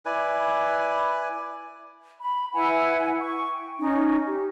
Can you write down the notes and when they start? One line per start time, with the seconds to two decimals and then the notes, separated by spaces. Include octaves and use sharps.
0.06 E4 B4 D5 G#5
2.20 B5
2.54 E4 B4 F#5 G#5
3.19 C#6
3.52 G5
3.78 C#4 D#4
4.26 G4